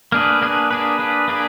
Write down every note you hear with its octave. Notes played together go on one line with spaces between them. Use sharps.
A#3 D4 G#4 B4
A#3 D4 G#4 B4
A#3 D4 G#4 B4
A#3 D4 G#4 B4
A#3 D4 G#4 B4